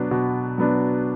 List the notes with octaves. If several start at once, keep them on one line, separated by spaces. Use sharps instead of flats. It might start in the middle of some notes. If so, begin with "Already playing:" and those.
Already playing: B2 F#3 B3 D4
B2
F#3 B3 D4